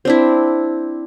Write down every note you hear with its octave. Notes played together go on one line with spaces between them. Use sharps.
C4 D4 E4